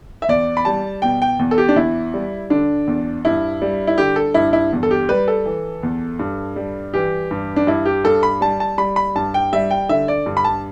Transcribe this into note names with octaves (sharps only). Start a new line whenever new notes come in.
E5
E2 D5
B5
G3 A5
B2 G5
G5
E2
A4
G4
D4
E2 E4
G3
D3 D4
E2
G2 E4
G3
E4
D3 G4
A4
G2 E4
E4
E2
A4
G4
G3 B4
A4
E3
E2
G2
G3
E3 G4
G2
D4
G2 E4
G4
G2 A4
B5
G3 A5
A5
G3 B5
B5
G2 A5
G5
G3 E5
G5
D3 E5
D5
G2
B5
A5